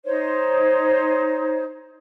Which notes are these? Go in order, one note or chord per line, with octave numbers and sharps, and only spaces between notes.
D#4 C5 C#5